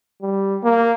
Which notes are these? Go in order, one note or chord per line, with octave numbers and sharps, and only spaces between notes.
G3
A#3